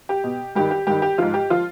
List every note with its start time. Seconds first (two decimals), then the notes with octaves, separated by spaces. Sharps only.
0.09 G4
0.24 B2
0.55 G2 D#3 G4
0.71 G4
0.87 G2 D#3 G4
1.02 G4
1.18 G#2 F3 F4
1.34 G4
1.50 F3 F4